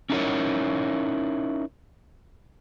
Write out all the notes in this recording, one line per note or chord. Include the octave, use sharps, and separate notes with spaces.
C#4 D#4 E4 F#4 A#4 C#5